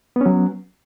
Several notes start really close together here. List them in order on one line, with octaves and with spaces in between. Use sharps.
B3 C#4 F#3